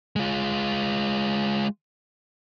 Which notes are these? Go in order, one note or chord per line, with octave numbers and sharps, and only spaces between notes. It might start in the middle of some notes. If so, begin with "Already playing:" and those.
G#3 F4